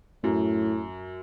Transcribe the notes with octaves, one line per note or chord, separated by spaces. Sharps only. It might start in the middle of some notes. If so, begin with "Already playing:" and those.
F#2 A2